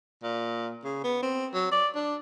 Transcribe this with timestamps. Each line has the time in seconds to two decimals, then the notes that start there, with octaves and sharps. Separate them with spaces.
0.23 A#2
0.84 C#3
1.04 B3
1.22 C4
1.54 F#3
1.72 D5
1.95 D4